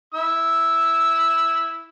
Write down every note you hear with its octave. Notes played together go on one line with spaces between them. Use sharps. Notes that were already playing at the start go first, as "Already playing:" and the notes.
E4 E6